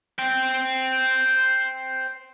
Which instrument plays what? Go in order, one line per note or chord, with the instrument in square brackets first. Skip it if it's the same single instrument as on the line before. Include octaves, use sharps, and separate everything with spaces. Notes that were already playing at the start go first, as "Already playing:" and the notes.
[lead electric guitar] C5 G5